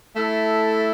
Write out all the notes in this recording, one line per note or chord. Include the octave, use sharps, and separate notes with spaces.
A3 E4 A4